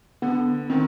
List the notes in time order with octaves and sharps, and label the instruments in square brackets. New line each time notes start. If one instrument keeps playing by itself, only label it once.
[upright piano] D3 [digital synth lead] B3
[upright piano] D#3 [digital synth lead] C4